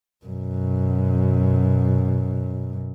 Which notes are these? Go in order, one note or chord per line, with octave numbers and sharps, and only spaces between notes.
F#2 B2